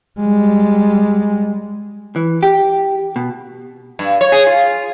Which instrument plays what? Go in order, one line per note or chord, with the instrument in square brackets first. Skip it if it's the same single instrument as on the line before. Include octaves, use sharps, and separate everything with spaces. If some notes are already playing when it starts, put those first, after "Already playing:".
[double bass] G3 G#3
[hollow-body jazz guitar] E3
G4
B2
[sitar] G2
C#5
G#4
F4